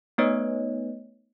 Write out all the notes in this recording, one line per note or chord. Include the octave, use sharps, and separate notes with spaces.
A3 B3 D#4 B4 C#5 D#5